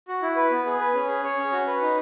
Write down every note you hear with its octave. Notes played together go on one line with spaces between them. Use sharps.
F#4
E4
B4
B3
G#4
B4
C#4
G#4
C#5
C#4
F#4
B4
D#4